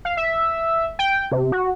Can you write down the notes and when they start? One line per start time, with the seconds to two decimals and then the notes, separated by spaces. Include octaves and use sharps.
0.05 F5
0.17 E5
0.99 G5
1.32 C3
1.52 F#4